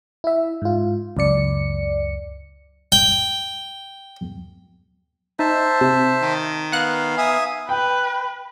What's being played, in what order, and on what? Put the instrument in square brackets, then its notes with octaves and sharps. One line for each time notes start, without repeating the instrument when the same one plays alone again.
[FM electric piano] E4 E5
G#2 F4
C#2 F#2 D5 C#7
[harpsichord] G5
[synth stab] D#4 [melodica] C5 E5 A5
[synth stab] C3
[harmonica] D#3
[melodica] B3 F5 [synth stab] F#5 F#6
[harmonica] E5 G#5 D#6
[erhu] B4 [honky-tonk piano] G5